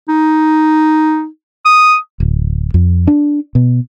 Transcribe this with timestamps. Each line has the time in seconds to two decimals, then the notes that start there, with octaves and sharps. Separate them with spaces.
0.09 D#4
1.65 D#6
2.20 D1
2.74 F2
3.07 D4
3.55 B2